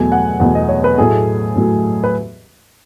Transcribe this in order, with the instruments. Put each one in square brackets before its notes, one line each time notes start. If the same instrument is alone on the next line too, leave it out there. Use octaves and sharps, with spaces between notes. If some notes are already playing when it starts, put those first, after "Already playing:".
Already playing: [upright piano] E2 B2 F#3 A3 G#5
F#5
E2 B2 F#3 A3 F#5
D#5
C#5
B4
A2 F#3 A3 G#4
A2 F#3 A3
B4